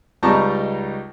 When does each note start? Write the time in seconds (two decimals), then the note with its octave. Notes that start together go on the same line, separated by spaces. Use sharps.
0.23 C#2 G3 D#4 A5 A#5 C#6